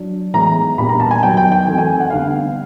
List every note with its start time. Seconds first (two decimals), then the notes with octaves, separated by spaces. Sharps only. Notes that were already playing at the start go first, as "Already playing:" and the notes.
Already playing: F#3 D4
0.34 A2 E3 G#3 B3 A#5
0.78 A#2 G3 B3 D4 B5
0.89 A#5
1.00 A5
1.11 G#5
1.23 D#3 F#3 B3 G5
1.37 G5
1.52 G5
1.66 E3 A3 C4 G#5
1.78 G#5
2.00 F#5
2.10 D3 G3 B3 F5